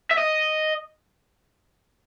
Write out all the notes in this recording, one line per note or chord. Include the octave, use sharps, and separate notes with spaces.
E5
D#5